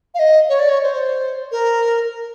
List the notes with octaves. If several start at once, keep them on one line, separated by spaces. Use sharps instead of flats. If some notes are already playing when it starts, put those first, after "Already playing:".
F5
D#5
C#5
D5
C#5
C5
A#4